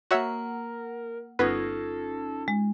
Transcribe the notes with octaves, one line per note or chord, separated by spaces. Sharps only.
A#3 F#4 A#4 C#5 E5 F#5
G1 B3 C#4 D#4 F4 A4 B4
G#3